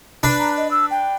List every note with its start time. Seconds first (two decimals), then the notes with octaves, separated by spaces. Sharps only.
0.23 D4 B4
0.40 A#5
0.57 D#5
0.71 E6
0.91 G5